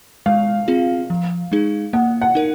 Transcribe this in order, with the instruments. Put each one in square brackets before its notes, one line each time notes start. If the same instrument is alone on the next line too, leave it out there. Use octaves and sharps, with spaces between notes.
[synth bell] G#3 [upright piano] F5
[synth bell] C4 F4 G#4
F3
G#3 D#4 G#4
[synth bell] A#3 [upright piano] F#5
[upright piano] F#5
[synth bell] D#4 A#4